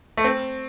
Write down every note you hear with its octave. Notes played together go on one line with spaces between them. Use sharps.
A3
C4